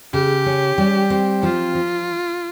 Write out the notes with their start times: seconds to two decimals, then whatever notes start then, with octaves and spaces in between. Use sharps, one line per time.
0.14 C#3 G4
0.46 C#4
0.78 G3
1.10 C4
1.43 F3 F4
1.75 F3